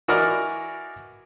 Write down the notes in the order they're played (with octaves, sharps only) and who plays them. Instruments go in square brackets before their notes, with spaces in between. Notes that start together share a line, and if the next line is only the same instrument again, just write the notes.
[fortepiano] E3 F#4 A#4 D5 D#5 F6